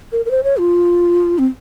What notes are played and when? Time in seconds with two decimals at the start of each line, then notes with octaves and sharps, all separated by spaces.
0.12 A#4
0.26 A#4
0.31 C5
0.44 C#5
0.57 F4
1.38 C4